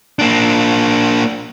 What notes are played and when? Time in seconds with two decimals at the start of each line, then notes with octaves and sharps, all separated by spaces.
0.19 A#3 D4